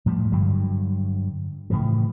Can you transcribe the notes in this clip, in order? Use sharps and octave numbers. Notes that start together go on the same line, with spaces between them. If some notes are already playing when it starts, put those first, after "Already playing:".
A2 F3 G3
G2 D3 F#3
A2 C#3 E3 F3